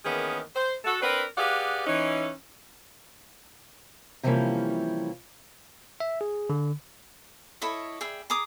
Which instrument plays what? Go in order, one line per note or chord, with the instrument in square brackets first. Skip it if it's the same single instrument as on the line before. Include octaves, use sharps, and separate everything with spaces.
[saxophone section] D#3 E3 A#3 B3 C#4 G#4
C5
F#4 A4
C4 D4 A#4 B4
G4 G#4 B4 D5 F5 F#5
E3 C#4 D#4
[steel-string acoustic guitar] C3 E3 F3 G3 A#3 C#4
[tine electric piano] E5
G#4
D3
[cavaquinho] E4 A4 C#5 D#5
G#4 D5 E5 G5
G#4 A#5 D6 D#6